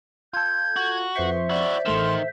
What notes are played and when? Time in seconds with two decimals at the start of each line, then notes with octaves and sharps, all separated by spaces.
0.33 F4 A4 G6 G#6
0.76 F#4
1.16 F2 B4 C5 E5 C6 C#6
1.49 E4 F#4 D5
1.85 A1 D#3 A3 C6 E6